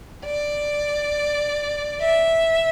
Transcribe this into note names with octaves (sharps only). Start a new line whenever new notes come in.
D5
E5